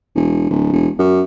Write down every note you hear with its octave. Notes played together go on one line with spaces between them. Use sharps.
E1
D1
E1
F#2